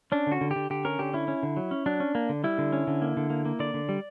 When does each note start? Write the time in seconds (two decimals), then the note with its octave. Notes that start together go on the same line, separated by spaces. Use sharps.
0.12 C#4 D4
0.27 D3 F#4
0.41 D3
0.51 G4
0.56 D3
0.70 D3 G4
0.85 C#4 A#4
0.99 D3 G4
1.13 C#4 E4
1.28 C#4
1.43 D3
1.57 F#3
1.71 C#4
1.86 F#3 D4
2.00 C#4
2.15 A#3
2.29 D3
2.44 G3 E4
2.58 D3
2.73 C#4
2.87 D3
3.02 A#3
3.17 D3
3.30 A#3
3.45 A#3
3.59 D3 D5
3.74 D3
3.89 G3